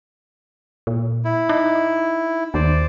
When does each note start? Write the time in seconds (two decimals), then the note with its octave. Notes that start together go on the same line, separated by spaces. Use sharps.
0.87 A#2
1.25 E4
1.49 D#4
2.54 D#2 C5 D5